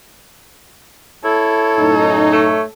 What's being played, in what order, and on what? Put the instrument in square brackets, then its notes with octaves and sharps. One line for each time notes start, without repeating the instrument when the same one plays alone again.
[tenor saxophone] E4 [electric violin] A4 [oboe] C#5
[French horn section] F#2 A2 D#4
[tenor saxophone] A3